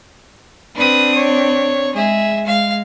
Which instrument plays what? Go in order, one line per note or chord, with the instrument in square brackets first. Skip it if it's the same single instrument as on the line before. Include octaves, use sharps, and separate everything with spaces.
[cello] C4 D4 [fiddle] B4 D#6
[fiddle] C#5
[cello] G#3 [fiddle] G#4 E5
[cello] G#3 [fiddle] F5